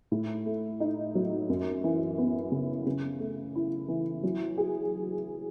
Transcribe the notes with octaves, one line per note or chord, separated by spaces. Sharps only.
A2
A3
D#4
F#3
F#2
E3
B3
C#3
C#3
A3
E4
E3
F#3
G#4